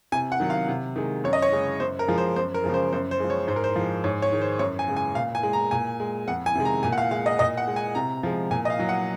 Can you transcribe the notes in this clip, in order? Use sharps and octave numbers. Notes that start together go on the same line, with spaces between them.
C3 G#5
F#5
D#3 F#3
F5
C3
D#3 G#3
F#2 C#5
D#5
C#5
C#3 G#3
F#2 C5
A#4
F3 G#3
C5
F#2 C5
A#4
C#3 F3 G#3
C5
F#2 C5
C5
F3 G#3
C#5
G#2 C5
A#4
C5
F3 G#3
G#2 C#5
C#5
D#3 G#3
C5
F#2 C#5
G#5
C#3 G#3
G#5
A#2 F5
G#5
G#3
A#5
A#2 G#5
G#3
F2 F#5
G#5
C3 D#3 G#3
A#5
A#2 G#5
F#5
F5
G#3 F5
D#5
A#2 D#5
F#5
G#3
G#5
C3 A#5
F3 G#3
A#2 G#5
D#5
F5
F#3
F#5